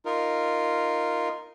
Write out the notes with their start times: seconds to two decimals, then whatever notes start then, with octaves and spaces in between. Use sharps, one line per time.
0.05 D#4 F4 A#4